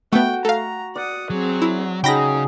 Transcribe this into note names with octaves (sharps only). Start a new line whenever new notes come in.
A3 B3 F#4 G5
A3 F5 A#5
D5 F#5 D#6
F#3 C4 G#4
E4
C#3 F#3 D#4 G#4 G5 B5 A#6